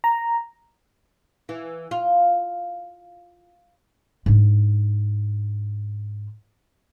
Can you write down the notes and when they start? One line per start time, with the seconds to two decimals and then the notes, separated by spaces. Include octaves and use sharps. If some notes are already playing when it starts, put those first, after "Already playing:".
0.04 A#5
1.49 E3
1.91 F4
4.26 G#2 D4